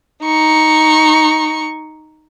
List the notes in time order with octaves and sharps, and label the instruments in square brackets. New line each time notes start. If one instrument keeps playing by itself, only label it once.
[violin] D#4 C#6